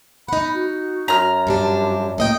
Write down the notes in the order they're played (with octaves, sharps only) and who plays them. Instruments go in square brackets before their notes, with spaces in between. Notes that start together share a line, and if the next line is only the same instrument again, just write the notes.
[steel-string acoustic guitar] D#4 F#5 [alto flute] B5
[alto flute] F#4
[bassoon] F#2 [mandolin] A#5 F6
[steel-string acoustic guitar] G2 F3 D4 [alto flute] G4
[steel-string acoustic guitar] A2 D#5 G5 [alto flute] A#3